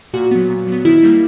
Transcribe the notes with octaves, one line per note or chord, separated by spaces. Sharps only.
A#2 F#4
F#3 B3
A#2
F#3
B3
D#3 E4
G3 A#3